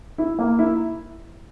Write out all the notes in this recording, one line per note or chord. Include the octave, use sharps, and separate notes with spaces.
E4
A#3
E4